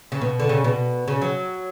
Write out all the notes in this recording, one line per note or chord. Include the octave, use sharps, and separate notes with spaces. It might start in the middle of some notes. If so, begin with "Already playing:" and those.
C#3
B2
D3
C#3
B2
C#3
F#3